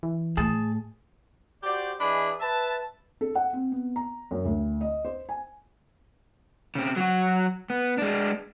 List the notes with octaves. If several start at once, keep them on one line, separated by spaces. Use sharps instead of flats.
E3
A2 G#4 A5
F#4 G4 C5 D5
E3 D4 G#4 D#5 B5
B4 E5 A5
A4
F#5
C4
B3
A#5
F#2
D2
D#5
C5
G#5
C#3 C4
F#3 F#4
B3
G#3 D4